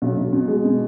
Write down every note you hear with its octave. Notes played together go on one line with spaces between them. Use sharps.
B1
B1
B2
G#3
B2